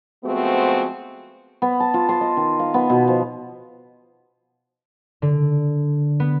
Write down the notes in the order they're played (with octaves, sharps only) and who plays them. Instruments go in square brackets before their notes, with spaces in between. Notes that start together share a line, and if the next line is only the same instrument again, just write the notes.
[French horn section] F3 G#3 A3 B3 C4 F#4
[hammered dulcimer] B3
A5
F4
C6
D#5
D#3
F5
B3
B2
F3
[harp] D3
B3